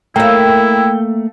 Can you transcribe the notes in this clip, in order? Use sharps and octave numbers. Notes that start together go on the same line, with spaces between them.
A3 A#3 E4 E5 G5